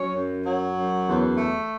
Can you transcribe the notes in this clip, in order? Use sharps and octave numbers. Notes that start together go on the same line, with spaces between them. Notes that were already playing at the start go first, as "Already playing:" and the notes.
Already playing: F#3 C#4 C#5
F#2
F#3
F#2
E2
A3